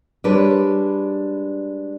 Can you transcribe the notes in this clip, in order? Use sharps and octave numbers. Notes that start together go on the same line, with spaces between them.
G3 G#3 D4 B4 C#5 D5